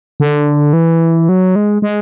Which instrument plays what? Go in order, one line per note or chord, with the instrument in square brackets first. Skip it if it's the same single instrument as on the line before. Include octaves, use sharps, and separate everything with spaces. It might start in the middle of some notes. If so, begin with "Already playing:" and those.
[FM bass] D3
E3
F#3
G#3
G#3